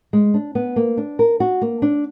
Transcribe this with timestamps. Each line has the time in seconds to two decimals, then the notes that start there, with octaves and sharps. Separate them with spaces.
0.13 G#3
0.34 D4
0.55 B3
0.76 A#3
0.97 D4
1.19 A#4
1.40 F#4
1.62 A#3
1.82 D4